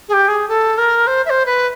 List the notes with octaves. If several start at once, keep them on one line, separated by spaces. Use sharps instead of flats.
G#4
G4
G#4
A4
A#4
C5
E5
C5
B4